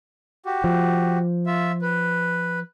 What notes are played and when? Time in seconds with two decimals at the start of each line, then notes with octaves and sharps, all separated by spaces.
0.46 F#4 G4
0.64 F3
1.46 F4 E5
1.82 B4